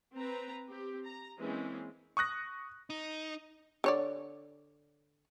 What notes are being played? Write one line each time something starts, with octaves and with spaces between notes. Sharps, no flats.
C4 B4 A#5
C4 G4
A#5
E3 G#3 A#3 C4 C#4
C#6 D#6 F#6 A#6
D#4
D3 C#5 D5